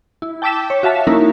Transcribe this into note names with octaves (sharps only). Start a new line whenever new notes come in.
E4
G5 A5 D6 E6 B6 E7
C#5
F#4 E5 F5 A5 B6
A#3 C#4 D#4 E4 A#4